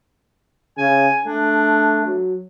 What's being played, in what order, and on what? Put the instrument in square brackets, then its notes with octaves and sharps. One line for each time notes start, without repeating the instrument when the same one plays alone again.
[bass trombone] C#3 [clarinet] G#5
[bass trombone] A3 [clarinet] D4
[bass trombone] F#3